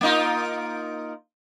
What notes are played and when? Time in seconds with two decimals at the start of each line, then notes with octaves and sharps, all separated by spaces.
0.01 A#3 D#4 F4